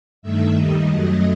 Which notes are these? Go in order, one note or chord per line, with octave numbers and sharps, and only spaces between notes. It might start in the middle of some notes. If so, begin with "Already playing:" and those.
G2 D#3 A3 E5
D#2 D#3 G3 D#5
F#2 F#3 A3